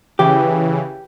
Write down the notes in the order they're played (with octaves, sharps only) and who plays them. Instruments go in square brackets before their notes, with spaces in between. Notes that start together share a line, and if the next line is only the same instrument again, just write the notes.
[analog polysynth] C#3 E3 [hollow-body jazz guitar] G4